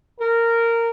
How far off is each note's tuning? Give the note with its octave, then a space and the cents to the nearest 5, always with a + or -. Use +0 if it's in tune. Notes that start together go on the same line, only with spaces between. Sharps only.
A#4 -15